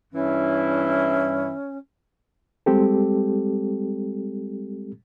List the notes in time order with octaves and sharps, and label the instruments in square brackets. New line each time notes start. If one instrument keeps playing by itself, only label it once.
[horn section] G2 E3 E4 [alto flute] C#4
[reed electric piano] G3 G#3 C4 G4 A4